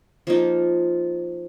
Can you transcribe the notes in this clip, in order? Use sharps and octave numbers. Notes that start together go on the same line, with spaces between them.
F3 A#3 D#4